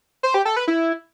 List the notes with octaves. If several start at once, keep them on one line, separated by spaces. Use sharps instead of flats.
C5
G4
A4
B4
E4